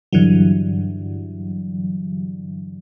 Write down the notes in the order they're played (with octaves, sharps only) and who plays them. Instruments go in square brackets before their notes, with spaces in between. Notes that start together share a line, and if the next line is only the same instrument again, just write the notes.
[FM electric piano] G2 D3 E3 F#3